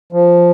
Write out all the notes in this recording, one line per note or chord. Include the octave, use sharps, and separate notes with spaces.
F3